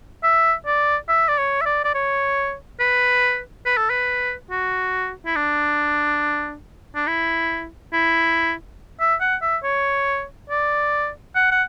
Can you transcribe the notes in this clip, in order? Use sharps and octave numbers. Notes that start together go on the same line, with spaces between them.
E5
D5
E5
D5
C#5
E5
D5
D5
C#5
B4
B4
A4
B4
F#4
E4
D4
D4
E4
E4
E5
F#5
E5
C#5
D5
F#5
F#5